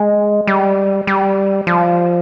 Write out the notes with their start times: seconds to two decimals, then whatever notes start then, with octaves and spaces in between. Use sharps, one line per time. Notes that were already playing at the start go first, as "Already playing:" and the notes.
Already playing: G#3
0.47 G3
1.07 G3
1.67 F3